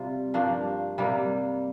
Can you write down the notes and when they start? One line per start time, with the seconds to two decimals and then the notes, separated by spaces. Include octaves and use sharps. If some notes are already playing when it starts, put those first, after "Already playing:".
Already playing: C3 G3 F4
0.34 G2 F3 A#3 D4
0.98 C3 G3 A#3